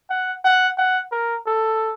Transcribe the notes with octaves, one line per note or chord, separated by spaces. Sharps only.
F#5
F#5
F#5
A#4
A4